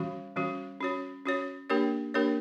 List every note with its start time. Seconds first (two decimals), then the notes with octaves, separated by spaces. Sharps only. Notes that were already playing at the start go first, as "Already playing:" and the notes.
Already playing: E3 G3 C#4 F#4
0.36 E3 G3 C#4 F#4
0.80 C#4 F#4 C#5
1.25 C#4 F#4 C#5
1.70 A#3 D4 G4 A#4 C#5
2.14 A#3 D4 G4 A#4 C#5